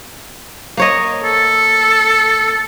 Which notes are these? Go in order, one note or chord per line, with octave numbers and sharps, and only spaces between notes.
A#3 C#5 D#5
A4